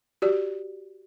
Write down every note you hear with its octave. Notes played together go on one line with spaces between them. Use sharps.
F#4 G4 D5